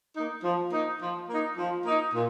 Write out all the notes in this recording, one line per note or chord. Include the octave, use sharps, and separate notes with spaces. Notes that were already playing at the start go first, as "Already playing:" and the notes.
A#3 D#4
F3
A#3 D#4
F3
A#3 D#4
F3
A#3 D#4
A#2